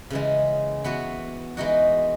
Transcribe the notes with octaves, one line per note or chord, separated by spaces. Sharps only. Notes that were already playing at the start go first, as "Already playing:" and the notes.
C#3 E3 G#3
E3 B3 F#4
E3 G#3 D#4 F#4